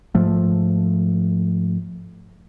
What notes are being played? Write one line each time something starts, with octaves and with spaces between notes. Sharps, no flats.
G#2 F3 A3